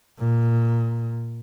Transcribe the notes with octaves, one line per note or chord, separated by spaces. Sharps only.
A#2